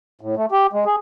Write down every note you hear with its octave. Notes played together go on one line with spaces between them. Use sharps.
A2
A3
G4
G#3
G#4